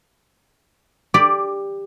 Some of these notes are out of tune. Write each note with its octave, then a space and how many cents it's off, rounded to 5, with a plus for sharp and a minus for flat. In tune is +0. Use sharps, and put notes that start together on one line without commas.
G4 +15 D5 +0